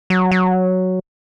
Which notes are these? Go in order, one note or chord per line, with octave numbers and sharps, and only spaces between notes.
F#3
F#3